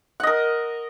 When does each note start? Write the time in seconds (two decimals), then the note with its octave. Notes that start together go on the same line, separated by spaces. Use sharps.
0.20 F#5
0.23 D#5
0.27 A#4